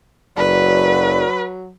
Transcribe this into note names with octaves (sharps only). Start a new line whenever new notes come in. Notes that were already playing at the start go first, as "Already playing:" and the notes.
F#1 F#3 B4 D5